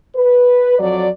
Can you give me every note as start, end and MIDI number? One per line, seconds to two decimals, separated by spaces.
0.15 0.76 71
0.79 1.08 41
0.79 1.08 54
0.79 1.08 74